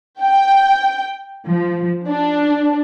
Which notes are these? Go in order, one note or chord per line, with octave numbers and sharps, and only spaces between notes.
G5
F3
D4